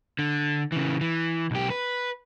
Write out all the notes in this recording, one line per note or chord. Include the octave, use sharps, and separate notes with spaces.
D3
C#3 E3
E3
B1 G4
B4